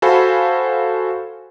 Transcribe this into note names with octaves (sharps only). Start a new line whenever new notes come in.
F#4 A4 C5 F5 G#5 B5